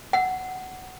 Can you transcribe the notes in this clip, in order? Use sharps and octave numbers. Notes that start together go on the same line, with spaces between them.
F#5